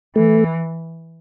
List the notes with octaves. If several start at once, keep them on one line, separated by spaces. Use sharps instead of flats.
E3 A3